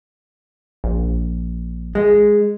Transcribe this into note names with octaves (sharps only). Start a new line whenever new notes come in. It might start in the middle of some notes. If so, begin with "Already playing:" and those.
A#1
G#3